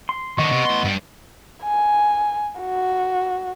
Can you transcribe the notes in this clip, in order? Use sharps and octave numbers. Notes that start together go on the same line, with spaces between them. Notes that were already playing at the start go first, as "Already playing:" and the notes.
C6
D#3 B3 D4 D#5 C#6
C3
A2 C6
G2 G3
G#5
F#4